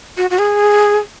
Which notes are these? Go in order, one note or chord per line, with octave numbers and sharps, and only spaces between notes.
F#4
F#4
G#4